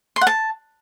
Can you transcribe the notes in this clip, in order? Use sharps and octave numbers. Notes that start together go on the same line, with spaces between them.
C6
F#5
A5